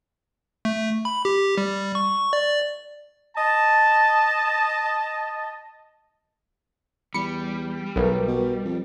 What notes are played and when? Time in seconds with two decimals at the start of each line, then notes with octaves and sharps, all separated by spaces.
0.65 A3
1.05 B5
1.25 G4
1.58 G3
1.95 C#6
2.33 D5
3.37 D#5 A5
7.14 E2 G3 B5 C#7
7.96 B1 A#4 B4
8.27 B2
8.65 F2